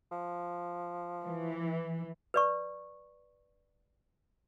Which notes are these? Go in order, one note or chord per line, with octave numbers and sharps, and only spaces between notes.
F3
E3
B4 D5 C#6